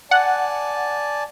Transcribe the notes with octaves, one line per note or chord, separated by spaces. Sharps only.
D5 F#5 G#5 A5